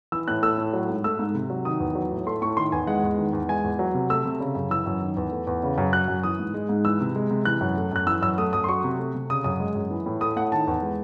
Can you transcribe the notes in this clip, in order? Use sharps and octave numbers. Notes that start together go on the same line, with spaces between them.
E3 E6
A2 F#6
A3 E6
A2
F#3
G#2
A3 E6
G#2
C3
F#3
D#3 D#6
E2
F#3
A2
A3 C6
A2 C#6
D#3 C6
E2 G#5
G#3 F#5
E2
D#3
E2
G#3 G#5
E2
F#3
C3
A3 E6
C3
C#3
F#2
E3 E6
F#2
D#3
E2
A3
E2
C#3
F#2
F#3 F#6
F#2
E3 D#6
G#2
G#3
G#2
E3 E6
C3
G#3
C3
E3 F#6
F#2
A3
F#2 F#6
E3 E6
F#2 E6
A3 D#6
F#2 D#6
C6
F#3 C#6
C3
A3
C3
C#3 D#6
F#2 D#6
G#3
F#2
E3
A2
A3 D#6
A2 F#5
D#3 A5
E2
G#3